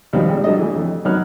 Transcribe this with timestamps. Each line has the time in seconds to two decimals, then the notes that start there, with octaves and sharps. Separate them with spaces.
0.13 D#2 B2 F3 G3 B3
0.29 G#1
0.44 F#3 G3 D4 A4 D#5
0.59 E3 A3
0.75 F2
1.05 F#2 F#3 B3 D#4 F6 F#6